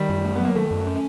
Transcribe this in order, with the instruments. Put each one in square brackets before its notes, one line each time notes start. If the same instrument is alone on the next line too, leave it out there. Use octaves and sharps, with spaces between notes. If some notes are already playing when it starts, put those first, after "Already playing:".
Already playing: [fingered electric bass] D#3 [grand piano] G3
[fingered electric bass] F#2
A3
[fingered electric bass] F#3 [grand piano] B3
[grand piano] A#3
[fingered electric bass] D#3 [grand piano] A3
[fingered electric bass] F#2
C#4